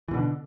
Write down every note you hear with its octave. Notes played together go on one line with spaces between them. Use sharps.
B2 D3 E3